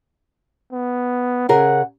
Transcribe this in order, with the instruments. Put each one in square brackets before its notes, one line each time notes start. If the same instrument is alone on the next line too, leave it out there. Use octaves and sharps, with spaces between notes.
[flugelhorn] B3
[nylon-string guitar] C#3 G#4 A#4 [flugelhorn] F#5